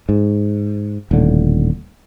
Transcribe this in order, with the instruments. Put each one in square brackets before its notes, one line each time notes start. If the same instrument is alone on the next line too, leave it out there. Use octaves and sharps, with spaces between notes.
[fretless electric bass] G#2
D#1 A2 D3